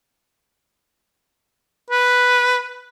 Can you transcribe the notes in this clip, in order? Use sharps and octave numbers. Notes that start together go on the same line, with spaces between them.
B4